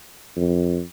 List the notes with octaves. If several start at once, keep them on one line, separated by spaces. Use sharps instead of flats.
F2